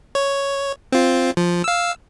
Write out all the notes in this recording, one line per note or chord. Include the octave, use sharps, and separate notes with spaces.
C#5
C4 F4
F3
F5 E6